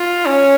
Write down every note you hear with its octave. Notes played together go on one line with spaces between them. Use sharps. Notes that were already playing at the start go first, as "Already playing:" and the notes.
Already playing: F4
C#4